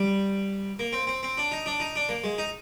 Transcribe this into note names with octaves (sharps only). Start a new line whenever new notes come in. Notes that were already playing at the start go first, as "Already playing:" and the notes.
Already playing: G3
A#3
C4
C4
C4
D4
D#4
D4
D#4
D4
A#3
G#3
D#4